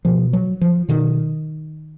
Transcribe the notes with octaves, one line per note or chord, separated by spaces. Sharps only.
B2 F3
F#3
F3
B2 D#3